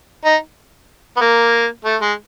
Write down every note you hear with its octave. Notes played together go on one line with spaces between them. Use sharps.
D#4
B3
A#3
A3
G#3